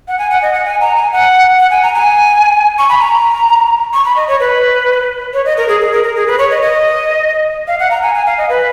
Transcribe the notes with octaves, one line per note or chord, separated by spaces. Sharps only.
F#5
G#5
F#5
D#5
F#5
G#5
A#5
G#5
F#5
F#5
G#5
A#5
G#5
C#6
B5
A#5
C#6
B5
D#5
C#5
B4
C#5
D#5
A#4
G#4
G#4
A#4
A#4
G#4
B4
C#5
D#5
D#5
F5
F#5
A#5
G#5
G#5
F5
D#5
B4